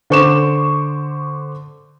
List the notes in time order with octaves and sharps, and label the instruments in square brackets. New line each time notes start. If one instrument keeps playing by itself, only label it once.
[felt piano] D3 C5 C#6 D6 E7